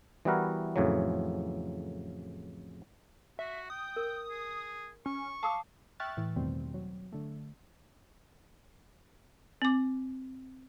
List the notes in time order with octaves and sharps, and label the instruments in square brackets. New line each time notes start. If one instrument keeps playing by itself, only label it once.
[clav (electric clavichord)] E3 G3 B3 E4 F#4 A#4
F2 A2 C#3 E3 F#3
[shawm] F#4 [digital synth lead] E5
[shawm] G5 [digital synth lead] D#6
[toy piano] A#4
[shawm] G#4
[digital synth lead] C#4 [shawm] C#6
[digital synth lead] F5 [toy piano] A5 D6 D#6
[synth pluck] E5 G5 C#6 F6 F#6 A6
A2 E3
E2 B2 D#3 G3 A3 C4
F#3
D3 A3
[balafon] C4 D6